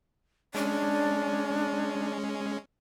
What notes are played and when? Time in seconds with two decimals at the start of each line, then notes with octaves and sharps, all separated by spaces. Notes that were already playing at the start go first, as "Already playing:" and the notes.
0.55 G#3 C#4 D4